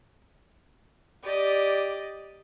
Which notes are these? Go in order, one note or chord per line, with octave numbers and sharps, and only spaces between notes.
G4 D5 D#5